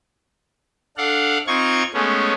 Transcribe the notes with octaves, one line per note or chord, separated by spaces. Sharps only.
D4 A4 F5 F#5
C4 D#4 F4 C#6 G#6
G#3 A3 B3 C#4